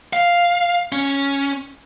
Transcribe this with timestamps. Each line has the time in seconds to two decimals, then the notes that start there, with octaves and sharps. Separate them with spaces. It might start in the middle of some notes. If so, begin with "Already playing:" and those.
0.13 F5
0.92 C#4